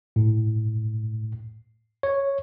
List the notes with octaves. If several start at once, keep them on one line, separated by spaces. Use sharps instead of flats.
A2
C#5